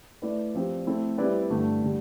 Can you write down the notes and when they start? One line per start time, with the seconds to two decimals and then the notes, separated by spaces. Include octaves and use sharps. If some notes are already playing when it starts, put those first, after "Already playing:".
0.22 A3 E4 B4 D5
0.55 F3 C4 G4 C5
0.86 A3 C4 E4 A4
1.18 G3 C4 E4 B4 D5
1.50 G2 D3 A3
1.83 D3 G3